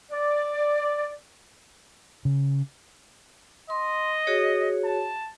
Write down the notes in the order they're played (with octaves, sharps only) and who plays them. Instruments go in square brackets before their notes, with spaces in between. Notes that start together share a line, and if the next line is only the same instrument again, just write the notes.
[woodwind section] D5
[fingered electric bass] C#3
[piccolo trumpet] D#5 [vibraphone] C6
[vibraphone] F#4 G#4 C#5
[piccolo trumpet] A5